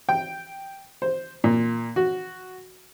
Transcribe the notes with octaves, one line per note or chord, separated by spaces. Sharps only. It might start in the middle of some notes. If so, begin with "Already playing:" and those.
G5
C5
A#2
F#4